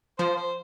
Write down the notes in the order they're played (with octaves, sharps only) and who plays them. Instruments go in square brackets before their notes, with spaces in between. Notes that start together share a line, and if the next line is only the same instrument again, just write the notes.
[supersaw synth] F3 [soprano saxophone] C5
[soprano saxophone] C5